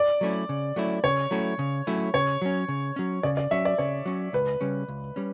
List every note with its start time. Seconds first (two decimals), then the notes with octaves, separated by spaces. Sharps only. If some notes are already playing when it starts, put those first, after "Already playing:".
Already playing: D5
0.21 F#3 A3 C#4 E4
0.49 C#3
0.76 F#3 A3 C#4 E4
1.04 C#3 C#5
1.31 F#3 A3 C#4 E4
1.59 C#3
1.87 F#3 A3 C#4 E4
2.14 C#3 C#5
2.42 F#3 C#4
2.69 C#3
2.96 F#3 C#4
3.23 C#3 D5
3.37 D5
3.51 F#3 C#4 E5
3.65 D5
3.78 C#3 C#5
4.06 F#3 C#4
4.33 C#2 B4
4.61 C#3 G3 C#4
4.88 C#2
5.16 G3 C#4